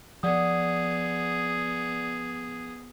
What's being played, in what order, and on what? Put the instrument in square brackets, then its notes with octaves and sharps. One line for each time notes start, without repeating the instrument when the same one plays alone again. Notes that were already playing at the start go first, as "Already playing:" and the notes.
[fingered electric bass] F3 [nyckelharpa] B3 G#4 [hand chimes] D5 F#5 D#6